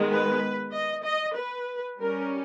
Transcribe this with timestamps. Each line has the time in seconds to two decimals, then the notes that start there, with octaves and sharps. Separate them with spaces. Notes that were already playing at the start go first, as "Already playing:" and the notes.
Already playing: D#3 G#3 B3
0.09 B4
0.72 D#5
1.04 D#5
1.36 B4
1.99 G3 C#4 A#4